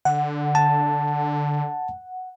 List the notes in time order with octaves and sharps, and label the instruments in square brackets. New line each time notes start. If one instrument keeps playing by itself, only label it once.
[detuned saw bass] D3 [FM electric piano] F#5
[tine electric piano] A5